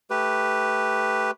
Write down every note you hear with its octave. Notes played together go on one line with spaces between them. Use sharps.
A3 G4 B4